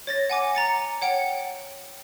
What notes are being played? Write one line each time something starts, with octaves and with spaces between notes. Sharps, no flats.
C#5 A6 A#6
F#5 G#5 D6
A#5 A6 C#7
C#5 F#5 G5 C#7